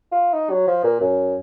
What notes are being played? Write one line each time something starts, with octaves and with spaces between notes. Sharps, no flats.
F4
D#4
F#3
F3
A#2
F#2